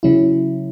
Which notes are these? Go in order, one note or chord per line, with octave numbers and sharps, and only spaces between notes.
C#3 F#3 C#4 E4